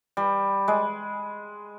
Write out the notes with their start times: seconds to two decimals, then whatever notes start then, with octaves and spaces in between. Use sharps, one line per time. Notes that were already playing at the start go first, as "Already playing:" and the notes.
0.17 G3
0.68 G#3